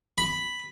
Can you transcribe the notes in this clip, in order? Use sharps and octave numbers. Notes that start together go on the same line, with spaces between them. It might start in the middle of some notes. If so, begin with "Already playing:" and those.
B5